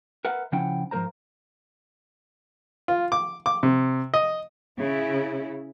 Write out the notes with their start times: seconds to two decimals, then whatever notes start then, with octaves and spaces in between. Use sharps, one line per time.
0.25 A#4 B4 E5 F#5
0.52 C#3 F3 C#4 E4 F#5 G5
0.91 G#2 F3 F#3 A#4 C5 A#5
2.88 F4
3.12 D6
3.46 D6
3.63 C3
4.14 D#5
4.79 C#3 E4